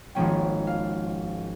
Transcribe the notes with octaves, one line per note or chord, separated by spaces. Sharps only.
G#1 G#2 F3 A#3 C#4 G5
F5